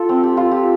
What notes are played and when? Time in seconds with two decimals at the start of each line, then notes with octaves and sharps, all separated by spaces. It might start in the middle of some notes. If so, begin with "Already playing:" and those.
Already playing: F4 A4
0.09 C4
0.23 G4
0.37 F4
0.52 G4